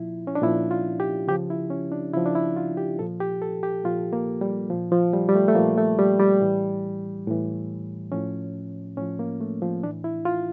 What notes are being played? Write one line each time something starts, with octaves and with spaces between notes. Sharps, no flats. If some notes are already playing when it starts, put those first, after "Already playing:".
Already playing: A#2 F3 E4
C#4
D4
A#2 F3 E4
F4
G4
C#3 F3 G4
E4
C#4
D4
C#3 F3 E4
D4
E4
F4
G4
A#2 F3 A4
G4
A4
G4
A#2 F3 F4
A#3
G3
A#2 F3
F3
G3
G3
A3
A3
A#2 F3 A#3
A3
G3
G3
A2 E3
A2 E3
A2 F3 C#4
A2 F3 C#4
A#3
A3
F3
A2 E3 D4
E4
F4